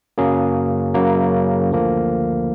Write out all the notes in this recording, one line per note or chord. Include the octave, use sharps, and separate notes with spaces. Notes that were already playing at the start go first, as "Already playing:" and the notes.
F#2 C#3 F#3 A#3 G#4
F#2 C#3 F#3 A#3
D2 D3 F3 A#3